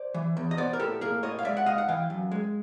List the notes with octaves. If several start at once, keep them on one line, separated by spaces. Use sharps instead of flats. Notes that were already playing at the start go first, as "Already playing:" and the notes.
Already playing: C5 D5
E3
E2
D#5
B3 C5 D5
A#4
A2 G4 A4
A#3 G#4 A#4
A2 C#5 D#5
F5
G#3 D5 E5
F#5
G#2 D#5 F5
F#5
E3 F5 G5
F#2
G#3